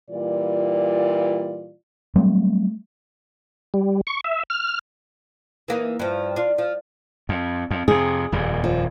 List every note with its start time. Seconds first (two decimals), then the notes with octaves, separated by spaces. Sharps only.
0.10 A#2 E3 G3 F4 D5
2.16 F#3 G3 A3 C4
3.74 G3
4.07 C#6
4.24 E5
4.50 F6
5.68 E3 A#3 D#4
5.99 G2 F3
6.36 D4 F4
6.58 F3
7.29 F2
7.71 F2
7.88 F2 C3 G#4
8.32 D#1 F2 A#2
8.64 F3